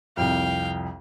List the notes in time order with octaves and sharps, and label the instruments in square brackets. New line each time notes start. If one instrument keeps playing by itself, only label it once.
[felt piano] C2 F2 [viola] F5 G5